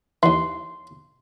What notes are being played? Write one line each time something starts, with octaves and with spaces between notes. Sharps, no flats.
D#2 E3 C6